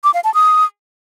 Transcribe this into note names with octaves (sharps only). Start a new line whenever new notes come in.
D6
F5
A5
D#6